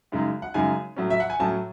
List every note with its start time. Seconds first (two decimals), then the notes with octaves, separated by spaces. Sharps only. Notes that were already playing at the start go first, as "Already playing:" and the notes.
0.12 F#2 C#3 G#3 D#4
0.42 F#5
0.54 F#2 C#3 G#3 D#4 G#5
0.96 A2 F#3 C#4
1.10 E5
1.20 F#5
1.30 G#5
1.40 A2 F#3 C#4 A5